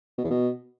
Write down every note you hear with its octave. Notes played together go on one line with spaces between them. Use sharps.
B2
E2
B2